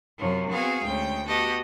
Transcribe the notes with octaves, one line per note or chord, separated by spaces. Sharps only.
F#2 C3 F3 C#4
B3 C4 F#4 G#4 F5 G#5
D2 G#3 C#4 G5
B3 F#4 G4 D#5 A5